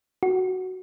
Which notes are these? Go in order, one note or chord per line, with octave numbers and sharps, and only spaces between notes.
F#4